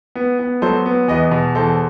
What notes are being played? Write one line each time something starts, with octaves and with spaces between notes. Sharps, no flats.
B3
B3
F#3 A4 C5
B3
E2 B4 D#5
B2
E2 A4 C5